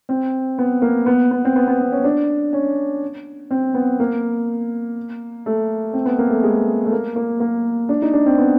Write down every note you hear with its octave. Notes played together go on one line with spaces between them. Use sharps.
C4
B3
A#3
B3
B3
C4
B3
B3
C4
C#4
D4
C#4
C4
B3
A#3
A3
C4
B3
A#3
A3
G#3
A3
A#3
A#3
A#3
D4
D#4
D4
C4
B3